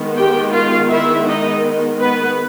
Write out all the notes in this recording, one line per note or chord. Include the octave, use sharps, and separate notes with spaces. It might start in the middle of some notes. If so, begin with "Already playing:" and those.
Already playing: D#3 G#3 B3
G4 G5
F4 F5
E4 E5
D#4 D#5
B3 B4